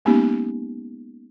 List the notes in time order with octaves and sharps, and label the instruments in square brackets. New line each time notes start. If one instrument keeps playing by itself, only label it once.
[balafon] G#3 A#3 B3 C#4 D#4 G4